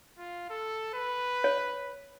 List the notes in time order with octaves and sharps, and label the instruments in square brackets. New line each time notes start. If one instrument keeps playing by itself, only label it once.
[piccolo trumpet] F4
A4
B4
[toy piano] C#5